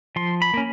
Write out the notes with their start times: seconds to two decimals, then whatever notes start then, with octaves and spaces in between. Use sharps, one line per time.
0.16 F3 C6
0.42 B5
0.54 A#3 C#4